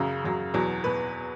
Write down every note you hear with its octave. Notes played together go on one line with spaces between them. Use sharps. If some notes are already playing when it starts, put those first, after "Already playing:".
Already playing: F#2 C#3 F#3
F#2 C#3 F#3
E2 B2 F#3
B2 B4